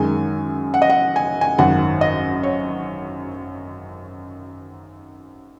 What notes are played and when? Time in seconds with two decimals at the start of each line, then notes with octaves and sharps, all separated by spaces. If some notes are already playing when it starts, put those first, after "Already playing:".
Already playing: F#2 D#3 G#3 G#5
0.74 F#5
0.82 D#5
0.90 F#5
1.16 G#5
1.41 G#5
1.58 G#1 F#2 D#3 F#5
2.01 D#5
2.43 C#5